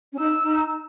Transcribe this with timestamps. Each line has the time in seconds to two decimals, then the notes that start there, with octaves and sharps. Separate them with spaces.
0.13 C#4
0.19 D#4 E6
0.42 D#4